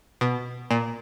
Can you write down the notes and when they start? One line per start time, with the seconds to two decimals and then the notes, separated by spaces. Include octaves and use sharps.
0.21 B2
0.71 A#2